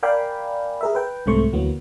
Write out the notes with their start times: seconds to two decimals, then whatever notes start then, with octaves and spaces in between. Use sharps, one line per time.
0.03 A#4 D5 F5 G5 G#5 B5
0.81 G#4 A#4 E5
0.95 B4 G5
1.26 C2 G#2 C3 A3 C5 C#6
1.53 D2 E3 F#3 A#3 B3